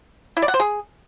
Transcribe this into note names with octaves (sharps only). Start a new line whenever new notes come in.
E4
D5
F#5
C5
G#4